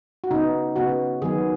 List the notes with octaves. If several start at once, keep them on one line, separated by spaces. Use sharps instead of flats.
F#4
C#3 B3 D#4
C#3 B3 F#4
D#3 F#3 B3 G#4